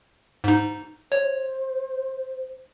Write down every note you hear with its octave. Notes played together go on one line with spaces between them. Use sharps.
G#2 D#4
C5 C#5